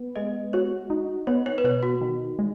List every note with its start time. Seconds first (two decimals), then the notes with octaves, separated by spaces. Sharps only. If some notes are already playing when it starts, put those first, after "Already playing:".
Already playing: B3
0.16 G#3 D#5
0.53 F#4 C#5
0.90 D#4
1.27 B3 C#5
1.46 C#5
1.58 B4
1.64 B2 C#5
1.83 F#4
2.01 D#3
2.39 G#3